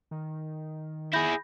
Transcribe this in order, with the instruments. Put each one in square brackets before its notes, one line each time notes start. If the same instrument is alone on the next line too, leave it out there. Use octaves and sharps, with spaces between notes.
[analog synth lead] D#3
[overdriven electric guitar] E4 G#4 [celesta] B5 G6 A#6